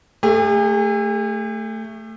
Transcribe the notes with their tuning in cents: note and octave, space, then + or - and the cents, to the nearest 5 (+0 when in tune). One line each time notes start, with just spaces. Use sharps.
A3 +10 G#4 -45